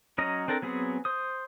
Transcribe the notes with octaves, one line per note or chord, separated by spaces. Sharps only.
F#3 C#4 D#5 A#5
C4 D4 A4 A#4
F#3 B3 C4 G#4
C5 D#6